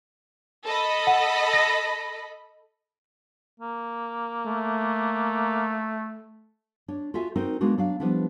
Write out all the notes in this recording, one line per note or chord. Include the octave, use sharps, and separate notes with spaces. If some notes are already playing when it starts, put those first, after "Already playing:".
A4 D#5 B5
F#5
A#6
A#3
A3
D4 C#5
F4 F#4 A4 E5 G#5
C4 D#4 F#4 A#4
G#3 A#3 B3 D4 F#4
F#3 D4 F5
F3 G3 B3 D4 E4